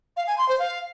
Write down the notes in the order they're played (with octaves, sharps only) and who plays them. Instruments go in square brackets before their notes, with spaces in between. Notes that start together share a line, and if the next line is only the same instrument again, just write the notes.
[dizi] F5
G#5
C6
C5
F5